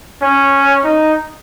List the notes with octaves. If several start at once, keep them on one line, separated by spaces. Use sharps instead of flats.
C#4
D#4